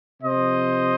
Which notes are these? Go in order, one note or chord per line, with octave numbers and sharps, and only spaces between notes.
C3 F3 C5 D#5